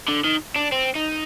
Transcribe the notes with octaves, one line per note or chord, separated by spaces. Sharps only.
D3
D#3
D4
C4
D#4